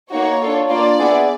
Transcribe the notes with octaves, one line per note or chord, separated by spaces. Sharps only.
A#3 D#4 F#4 C#5
D4 F4 A4
A#3 D4 F4 D5
B3 E4 G#4